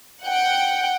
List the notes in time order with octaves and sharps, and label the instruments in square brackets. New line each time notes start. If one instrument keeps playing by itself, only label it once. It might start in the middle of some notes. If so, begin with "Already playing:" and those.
[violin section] F#5 G5